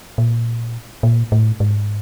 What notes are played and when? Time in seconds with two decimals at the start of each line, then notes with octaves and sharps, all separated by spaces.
0.18 A#2
1.03 A#2
1.32 A2
1.60 G#2